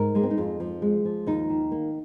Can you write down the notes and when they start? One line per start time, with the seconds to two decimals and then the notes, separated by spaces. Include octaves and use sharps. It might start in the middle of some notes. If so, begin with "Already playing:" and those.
Already playing: G#2 A#4
0.15 G#3 A#3
0.23 C4
0.31 D#4
0.37 F2 F4
0.60 F3
0.82 G#3
1.05 F3
1.27 D#2 D#4
1.50 D#3
1.72 A#3